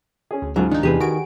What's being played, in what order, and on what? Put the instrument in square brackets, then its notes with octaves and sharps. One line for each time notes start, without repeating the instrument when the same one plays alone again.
[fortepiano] C#4 G#4
[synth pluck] D2
[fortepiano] G#2 C#3 F3 [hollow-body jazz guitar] F#3
[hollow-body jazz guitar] D#3 [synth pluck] D4 D#4
[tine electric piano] E2 C3 E3 [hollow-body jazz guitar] G4 G#4 B4
[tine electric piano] D#3 [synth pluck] F#4 D7 [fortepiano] G#5